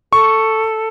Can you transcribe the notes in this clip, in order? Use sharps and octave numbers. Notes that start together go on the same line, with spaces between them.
A4 C#6